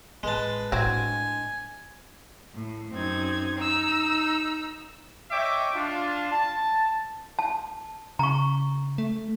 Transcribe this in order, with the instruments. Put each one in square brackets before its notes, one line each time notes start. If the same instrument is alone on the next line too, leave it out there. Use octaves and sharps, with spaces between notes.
[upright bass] A1 [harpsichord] G#3 A5 [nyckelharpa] B4
[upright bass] A2 D4 [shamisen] F#3 C4 [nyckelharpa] G#5
[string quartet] A2
F#2 C4 D#4 G#6
D#4 A#5 E6
[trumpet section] C#5 D#5 E5 G5 D6
D4 F4
A5
[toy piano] A5
[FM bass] C#3 [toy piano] A#5 C#6
[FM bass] A3